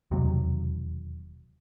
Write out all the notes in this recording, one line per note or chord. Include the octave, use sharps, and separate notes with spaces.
E1 D#2 C3 F#3